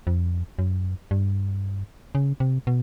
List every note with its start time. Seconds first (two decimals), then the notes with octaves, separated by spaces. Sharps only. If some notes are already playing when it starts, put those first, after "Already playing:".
0.07 F2
0.59 F#2
1.11 G2
2.15 C#3
2.40 C3
2.67 B2